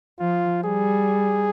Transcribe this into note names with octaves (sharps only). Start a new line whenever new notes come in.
F3 F4
G3 G#4